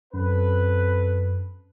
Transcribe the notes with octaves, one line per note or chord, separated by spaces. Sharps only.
F#2 C4 A4 B4